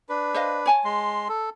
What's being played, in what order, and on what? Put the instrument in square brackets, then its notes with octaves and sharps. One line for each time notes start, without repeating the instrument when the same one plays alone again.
[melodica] D4 B4
[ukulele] C5 D#5 F5
C#5 G#5 A5
[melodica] G#3 C6
A4